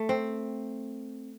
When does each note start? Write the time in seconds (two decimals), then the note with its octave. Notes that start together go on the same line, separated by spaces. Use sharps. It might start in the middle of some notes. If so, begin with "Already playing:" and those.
Already playing: A3
0.09 C4